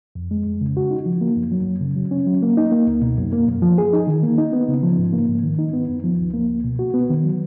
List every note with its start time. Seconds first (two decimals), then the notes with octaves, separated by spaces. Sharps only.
0.15 F2
0.31 G#3
0.46 F2
0.61 C#3
0.77 F#4
0.91 D#4
1.06 F3
1.21 A#3
1.36 F#2
1.52 F#3
1.67 F#2
1.81 C#3
1.96 F#3
2.11 C#4
2.27 F#3
2.42 A#3
2.57 D#4
2.72 A#3
2.87 C#2
3.02 B2
3.17 F#2
3.33 A#3
3.48 F#2
3.62 F3
3.78 G#4
3.93 D#4
4.07 D#3
4.23 A#3
4.38 D#4
4.53 B3
4.68 C#3
4.83 F3
4.98 G#2
5.13 A#3
5.28 G#2
5.43 D#3
5.59 D#4
5.73 B3
5.89 F#2
6.04 F3
6.18 C#2
6.34 A#3
6.49 C#2
6.64 B2
6.79 F#4
6.94 B3
7.10 D#3
7.24 F#3